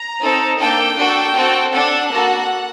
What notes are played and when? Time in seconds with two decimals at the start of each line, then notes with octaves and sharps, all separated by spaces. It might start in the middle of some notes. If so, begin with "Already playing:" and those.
Already playing: A#5
0.21 C4 D#4 A4
0.60 A#3 D4 A4 G5
0.97 D4 F#4 A4
1.35 C4 F#4 A4
1.73 D4 A4 F#5
2.11 A#3 F#4 A4